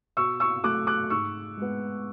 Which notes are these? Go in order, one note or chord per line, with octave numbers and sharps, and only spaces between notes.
B2 C#6 E6
C#6 E6
F#3 A3 D6 F#6
D6 F#6
G#2 C#6 E6
G#3 B3